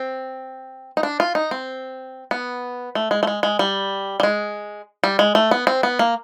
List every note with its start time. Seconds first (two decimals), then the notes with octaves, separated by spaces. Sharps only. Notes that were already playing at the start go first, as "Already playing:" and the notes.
Already playing: C4
0.97 D#4
1.03 D4
1.20 F4
1.35 D#4
1.51 C4
2.31 B3
2.95 A3
3.11 G#3
3.23 A3
3.27 G#3
3.43 G#3
3.59 G3
4.20 G3
4.23 G#3
5.04 G3
5.19 G#3
5.35 A3
5.51 B3
5.67 C4
5.83 B3
5.99 A#3